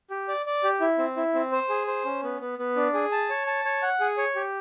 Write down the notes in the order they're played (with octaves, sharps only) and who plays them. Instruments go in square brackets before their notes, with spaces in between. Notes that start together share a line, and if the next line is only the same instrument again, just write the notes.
[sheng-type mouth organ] G4
D5
D5
G4
E4
C4
E4
C4
C5
G#4
C5
C#4
B3
B3
B3
D4
G#4
A5
C#5
A5
C#5
F#5
G#4
C#5
G4